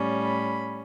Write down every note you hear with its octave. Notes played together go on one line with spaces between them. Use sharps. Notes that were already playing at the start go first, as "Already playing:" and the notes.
Already playing: A2 G3 C#4
B5